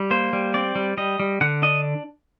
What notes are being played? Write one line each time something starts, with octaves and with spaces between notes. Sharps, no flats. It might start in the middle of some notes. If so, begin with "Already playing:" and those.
Already playing: G3
A#3 C5
G3
C4 D5
G3
G3 D#5
G3
D3 F#5
D4 D#5